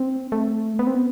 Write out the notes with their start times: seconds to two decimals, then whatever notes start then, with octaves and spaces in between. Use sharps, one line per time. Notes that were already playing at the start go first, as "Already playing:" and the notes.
Already playing: C4
0.32 A3
0.79 B3
0.87 C4
0.95 B3